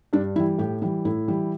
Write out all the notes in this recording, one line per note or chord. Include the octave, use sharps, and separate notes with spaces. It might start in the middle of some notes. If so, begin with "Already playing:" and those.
G2 D4
E3 G3 E4
A2 G4
E3 G3
A2 E4
E3 G3